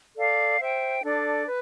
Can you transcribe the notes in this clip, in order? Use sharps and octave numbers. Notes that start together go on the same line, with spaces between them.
A4 D5 F5
C5 E5 G5
D4 A4 D5
B4